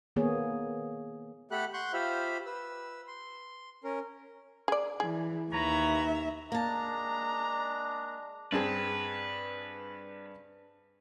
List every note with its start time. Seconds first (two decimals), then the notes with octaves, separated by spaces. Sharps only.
0.16 D#3 A#3 B3 G#4 C#5
1.51 A3 G4 A4 F#5 B5 F#6
1.73 F#5 C6 C#6 F#6 G6
1.93 F4 G4 C5 E5 F5 B5
2.46 B4 E6
3.07 C6
3.84 C#4 A#4
4.68 G#4 D5
5.00 E3 G#4
5.52 D#2 B4 C#5 E5 A#5
6.52 G#3 A#3 D4 A5 A#5
8.52 G2 C4 G#4 B4